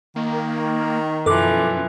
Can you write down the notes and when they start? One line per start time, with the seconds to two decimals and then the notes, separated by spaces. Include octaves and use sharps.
0.16 D#3 A#3
1.26 F#2 B2 E3 F3 A4 D6